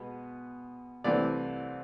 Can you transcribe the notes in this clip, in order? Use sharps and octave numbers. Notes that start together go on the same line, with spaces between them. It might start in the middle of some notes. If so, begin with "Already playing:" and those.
Already playing: B2 G#3 B3
C2 C3 E3 A3 C4 D5